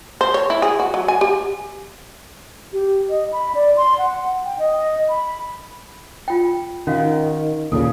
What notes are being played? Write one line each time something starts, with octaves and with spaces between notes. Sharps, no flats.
C5
C#5
E4
G#4
F#4
F#3
G#5
G4
G4
D#5
B5
D5
C6
F#5
G5
D#5
B5
F4 G5
D#3 C#4 F#4 F5
D#2 A#2 C#3 A4